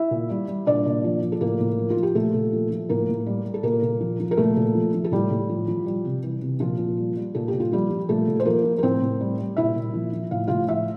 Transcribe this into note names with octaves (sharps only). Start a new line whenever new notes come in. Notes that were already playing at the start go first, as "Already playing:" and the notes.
Already playing: E4 E5
A#2
G3
G3
A#2 D4 D5
A#2
F3
F3
A4
A2 A#3 A#4
A2
F3
F4
F3
G4
A#2 A3 A4
A#2
F3
F3
A2 A#3 A#4
A2
G3
G3
A4
A#2 A#3 A#4
A#2
F3
F3
A#4
A#2 A3 A4
A#2
F3
F3
A4
A2 G3 G4
A2
F3
F3
G3
C3
E3
C3
A#2 F3 F4
A#2
G3
G3
A#2 A4
G4
A#2
F4
F3 G3 G4
F3
A#2 A3 A4
A#2
C5
F3 A#3 A#4
F3
A#4
A2 C4 C5
A2
G3
G3
A#2 E4 E5
A#2
F3
F3
A2 F5
A2 F4 F5
F3 E4 E5